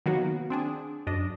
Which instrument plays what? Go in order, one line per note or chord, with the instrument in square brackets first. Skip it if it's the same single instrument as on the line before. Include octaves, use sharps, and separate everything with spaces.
[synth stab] D#3 F#3 A#3 B3 F#4
C4 D4 G#4
F#2 D4 D#5